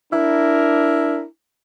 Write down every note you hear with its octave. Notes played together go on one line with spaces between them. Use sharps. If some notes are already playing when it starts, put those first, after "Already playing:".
D4 E4 A#4